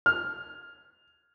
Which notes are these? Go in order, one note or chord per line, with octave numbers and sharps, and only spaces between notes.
F6